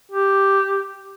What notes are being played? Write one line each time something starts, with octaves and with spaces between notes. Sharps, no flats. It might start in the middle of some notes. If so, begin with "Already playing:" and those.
G4